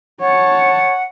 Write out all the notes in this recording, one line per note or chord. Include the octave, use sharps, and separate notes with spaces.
C#5 F#5 A5